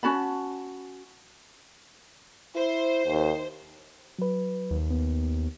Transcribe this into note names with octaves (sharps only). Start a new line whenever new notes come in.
C#4 F#4 A5 B5
E4 C5
D#2 D#3
F#3 B4
D#2
B3